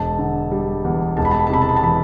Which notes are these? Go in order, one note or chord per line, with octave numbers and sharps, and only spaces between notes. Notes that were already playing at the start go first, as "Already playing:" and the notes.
Already playing: E1 A5
D3
G3
E2
E1 A5
B5
A5
B5
A5
C3 B5
A5
B5
A5
E3 B5